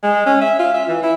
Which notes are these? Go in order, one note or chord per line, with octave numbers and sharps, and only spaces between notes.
G#3
C#4
E5
F4
E5
E3
E4